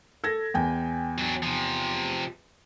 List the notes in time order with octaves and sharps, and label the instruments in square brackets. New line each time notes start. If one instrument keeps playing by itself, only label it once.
[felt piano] A4 G#6 A#6
E2 G5 G#5
[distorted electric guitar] F#3 D4
C3 F3